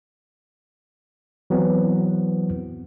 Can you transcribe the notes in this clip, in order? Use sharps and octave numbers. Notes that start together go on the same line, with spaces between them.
E3 F#3 B3 C4